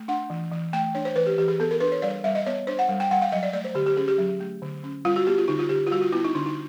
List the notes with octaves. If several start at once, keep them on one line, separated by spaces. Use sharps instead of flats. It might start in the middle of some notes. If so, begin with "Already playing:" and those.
Already playing: A3
D4 F#5
E3
E3
A3 G5
D4 C#5
C5
E3 B4
G4
E3 G4
G#4
B3 A4
A#4
D4 B4
C#5
G3 D5
G3 E5
D#5
B3 C#5
D4 C5
F#5
G3
G5
G3 F#5
F5
F#3 D#5
D5
A3 D5
C5
D3 G4
G4
C#4 G#4
G4
F#3
A3
D3
C#4
G3 F4
F#4
B3 G4
F4
D3 D#4
F4
D3 G4
F4
G3 F#4
F4
B3 E4
D#4
D3 D4
D#4